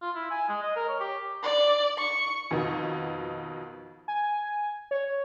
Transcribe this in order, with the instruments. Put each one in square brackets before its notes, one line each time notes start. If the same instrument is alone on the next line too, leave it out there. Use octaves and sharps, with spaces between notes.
[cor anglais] F4
E4
G#5
G#3
D#5
A#4
C#5
G4
[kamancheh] D5
C#6
[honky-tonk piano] F2 B2 D#3 B3 D#4
[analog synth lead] G#5
C#5